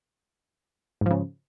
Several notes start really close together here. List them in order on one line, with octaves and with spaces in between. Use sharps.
G#2 F3 C#3